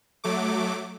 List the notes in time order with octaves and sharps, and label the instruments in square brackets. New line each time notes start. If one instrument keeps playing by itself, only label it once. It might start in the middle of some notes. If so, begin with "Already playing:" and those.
[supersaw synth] F#3 A3 D6